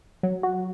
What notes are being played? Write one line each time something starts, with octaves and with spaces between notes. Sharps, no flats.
F#3
F#4